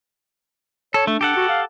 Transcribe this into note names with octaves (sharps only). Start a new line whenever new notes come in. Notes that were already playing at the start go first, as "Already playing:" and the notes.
A4 C#5
A3 D4
G4 A4 F#5
F#4
F5